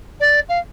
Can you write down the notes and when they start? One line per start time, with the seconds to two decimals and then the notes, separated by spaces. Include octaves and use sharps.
0.20 D5
0.49 F5